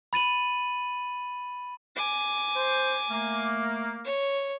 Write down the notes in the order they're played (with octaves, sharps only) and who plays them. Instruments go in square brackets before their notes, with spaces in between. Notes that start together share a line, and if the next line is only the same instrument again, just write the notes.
[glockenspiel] B5 A6 D#7 F#7
[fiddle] G#5 D6
[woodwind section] C5
A3 A#3
[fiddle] C#5